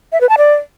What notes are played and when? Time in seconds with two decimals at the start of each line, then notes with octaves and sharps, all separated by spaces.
0.12 E5
0.21 B4
0.29 A5
0.38 D5